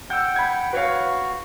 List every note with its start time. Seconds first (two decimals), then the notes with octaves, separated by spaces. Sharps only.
0.10 F#5 G5 E6 G6
0.36 B5 G#6
0.73 F#4 B4 C#5 F5